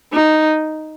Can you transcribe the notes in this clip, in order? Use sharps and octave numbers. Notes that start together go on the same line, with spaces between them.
D#4